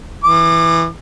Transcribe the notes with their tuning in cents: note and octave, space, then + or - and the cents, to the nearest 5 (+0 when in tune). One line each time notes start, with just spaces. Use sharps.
E3 +0 D6 +35